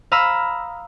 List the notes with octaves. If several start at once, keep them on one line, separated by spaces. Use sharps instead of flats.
F5 A#5 B5 D#6 E6